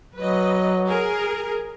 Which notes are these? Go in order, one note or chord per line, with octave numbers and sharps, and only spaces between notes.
F#3 B4 D#5
G#4 A#4